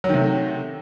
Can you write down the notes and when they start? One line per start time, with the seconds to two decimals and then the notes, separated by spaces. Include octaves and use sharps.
0.04 F#3
0.09 D#3
0.14 C3
0.19 A3